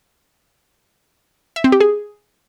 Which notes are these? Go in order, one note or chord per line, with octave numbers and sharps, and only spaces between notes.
E5
C4
G4
G#4